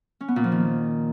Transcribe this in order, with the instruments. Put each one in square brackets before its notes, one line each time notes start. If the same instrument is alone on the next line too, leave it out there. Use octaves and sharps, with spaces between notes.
[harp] C#4
B3
A#2
F3
D#3